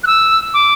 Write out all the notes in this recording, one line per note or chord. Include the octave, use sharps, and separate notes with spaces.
F#6
E6
D6